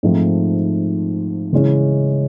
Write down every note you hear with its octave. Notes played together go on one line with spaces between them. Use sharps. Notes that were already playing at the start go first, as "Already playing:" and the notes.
G#2 F3 A3 C4 D#4
C#3 E3 G#3 C#4